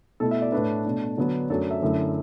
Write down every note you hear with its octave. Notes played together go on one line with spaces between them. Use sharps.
B2 A3 E4 A4
E5
D5
A2 A3 D4 B4
B2 A3 D4
D3 F#3 B3 D4
F#2 F#3 A3 D4 A4
E5
F#2 D3 A3 E4